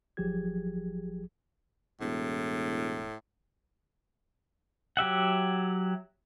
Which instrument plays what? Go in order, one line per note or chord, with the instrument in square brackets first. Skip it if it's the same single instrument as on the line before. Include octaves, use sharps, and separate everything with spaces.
[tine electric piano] G1 F3 F#3 G4 G#4 G#6
[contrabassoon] E1 [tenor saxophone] A2
[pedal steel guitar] F#3 G4 E5 F#5